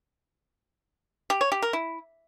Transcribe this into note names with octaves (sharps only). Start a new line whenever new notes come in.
G4
C#5
G4
A#4
E4